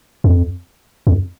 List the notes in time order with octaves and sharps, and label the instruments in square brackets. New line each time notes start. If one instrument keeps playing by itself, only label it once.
[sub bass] F2
F2